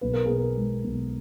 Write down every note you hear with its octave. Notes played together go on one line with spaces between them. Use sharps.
B1 B4
A#4
B2 G#4
A#4
G#3
B1